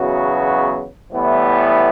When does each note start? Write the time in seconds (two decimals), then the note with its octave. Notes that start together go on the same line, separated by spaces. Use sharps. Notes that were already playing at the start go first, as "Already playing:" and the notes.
Already playing: E2 C#3 F#3 B3 F#4
1.12 A2 E3 G3 B3